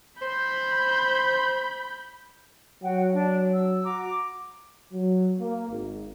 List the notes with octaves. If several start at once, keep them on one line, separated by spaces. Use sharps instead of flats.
C5 B5 G6
F#3 F#4 F#5 G5
D4
E6
F#4 A#5 D6
F#3
A#3
G#1